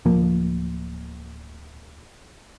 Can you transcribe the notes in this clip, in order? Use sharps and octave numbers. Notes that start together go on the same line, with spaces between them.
D1 F3 A#3